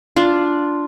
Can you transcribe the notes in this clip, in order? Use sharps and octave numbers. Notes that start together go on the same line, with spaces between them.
D4 F4